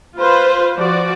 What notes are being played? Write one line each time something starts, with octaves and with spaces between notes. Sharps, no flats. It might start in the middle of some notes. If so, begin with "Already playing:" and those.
F4 B4 C5
F3 F#4 D5